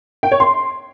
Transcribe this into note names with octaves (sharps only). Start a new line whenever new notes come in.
G5
C#5
C6